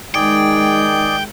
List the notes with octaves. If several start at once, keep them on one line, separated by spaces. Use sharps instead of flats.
D#3 G#3 D#4 G#4 D5 G5